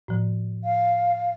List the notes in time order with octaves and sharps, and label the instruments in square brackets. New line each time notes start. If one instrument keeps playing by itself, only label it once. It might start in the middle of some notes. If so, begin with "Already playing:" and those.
[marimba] A2 F3
[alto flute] F5